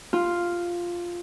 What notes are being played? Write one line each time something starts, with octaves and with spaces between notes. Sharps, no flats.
F4